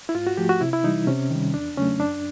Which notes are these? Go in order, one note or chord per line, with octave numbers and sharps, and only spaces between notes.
E4
G#2 F4
F#4
F3 A3 G4
F#4
C3 E4
E4
E3 G3 D#4
C3 C#4
D#3 G3
E2 D4
C#3 F#3 A3 C#4
F#2 D4